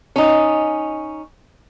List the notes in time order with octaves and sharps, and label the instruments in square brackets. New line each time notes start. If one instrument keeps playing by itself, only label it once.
[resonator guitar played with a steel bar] C#4 D#4